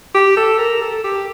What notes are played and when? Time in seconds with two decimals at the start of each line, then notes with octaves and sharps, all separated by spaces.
0.15 G4
0.37 A4
0.59 A#4
0.81 A4
1.04 G4